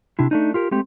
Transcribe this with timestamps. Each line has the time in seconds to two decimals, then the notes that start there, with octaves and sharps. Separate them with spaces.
0.19 C3 D4 E4
0.31 A3 D4 D#4
0.54 F4 G4 A#4
0.71 G#3 A3 C4 G4